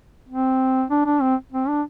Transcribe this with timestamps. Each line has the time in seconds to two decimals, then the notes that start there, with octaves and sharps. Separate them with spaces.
0.29 C4
0.90 D4
1.06 D4
1.21 C4
1.52 C4
1.68 D4